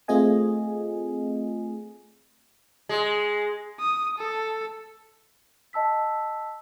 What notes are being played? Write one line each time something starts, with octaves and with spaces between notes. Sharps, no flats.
A3 C4 F4 G#4 D#5 G#5
G#3
D#6
A4
D#5 A5 E6 B6